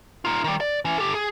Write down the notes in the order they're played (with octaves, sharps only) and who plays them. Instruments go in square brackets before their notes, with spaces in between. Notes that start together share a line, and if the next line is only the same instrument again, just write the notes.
[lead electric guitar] D#4 F4
D#3 G3
D5
E3 C#4
G4 A4
G#4